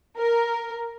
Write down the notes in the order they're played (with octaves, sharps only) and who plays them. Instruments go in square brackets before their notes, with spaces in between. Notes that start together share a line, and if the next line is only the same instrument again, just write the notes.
[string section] A#4